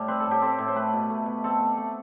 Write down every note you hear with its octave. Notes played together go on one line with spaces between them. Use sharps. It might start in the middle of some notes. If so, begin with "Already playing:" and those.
Already playing: A2 G3
C4 B4
A4
A2
G4
C4 A4
A2
C5
A3 B4
B2
A3
B2
C4 A4
A3
A3